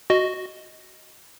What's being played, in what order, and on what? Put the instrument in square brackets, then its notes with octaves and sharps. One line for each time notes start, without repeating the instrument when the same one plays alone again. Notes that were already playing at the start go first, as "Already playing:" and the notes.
[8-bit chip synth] F#4 D#5